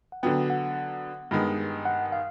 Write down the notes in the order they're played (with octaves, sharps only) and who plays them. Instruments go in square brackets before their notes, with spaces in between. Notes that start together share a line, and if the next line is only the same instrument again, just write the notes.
[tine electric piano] F#5
[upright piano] D3 F#3 B3 [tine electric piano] G5
[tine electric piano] F#5
[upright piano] G2 D#3 G#3 B3
[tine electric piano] F#5
F5